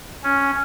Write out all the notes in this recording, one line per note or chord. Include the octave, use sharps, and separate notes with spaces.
C#4